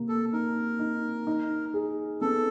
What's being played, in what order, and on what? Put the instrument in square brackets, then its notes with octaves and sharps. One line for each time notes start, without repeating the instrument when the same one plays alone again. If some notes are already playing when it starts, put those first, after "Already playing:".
Already playing: [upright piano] C3 A#3
[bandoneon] A4
[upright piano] D#4 [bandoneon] A#4
[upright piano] D#4
D#4
G#4
[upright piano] B3 [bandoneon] A4